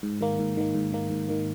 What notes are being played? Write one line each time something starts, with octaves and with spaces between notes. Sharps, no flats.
G#2
D#3 A#3
G#2
D#3 A#3
G#2
D#3 A#3
G#2
D#3 A#3